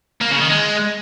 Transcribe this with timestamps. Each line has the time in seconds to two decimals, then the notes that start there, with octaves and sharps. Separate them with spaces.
0.21 A#3
0.31 C#3
0.40 D#3
0.50 G#3